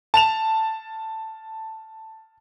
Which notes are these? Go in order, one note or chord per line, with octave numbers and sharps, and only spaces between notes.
A5 E7 F7